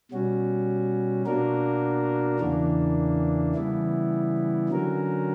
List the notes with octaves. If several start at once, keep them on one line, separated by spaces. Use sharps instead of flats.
B2 G3 C#4 F#4
B2 A#3 D4 F#4 A#4
E2 C#3 E3 A#3 D4
C#3 E3 G3 B3 E4
D3 F#3 C#4 F#4 A#4